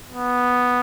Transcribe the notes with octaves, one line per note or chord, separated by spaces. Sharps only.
B3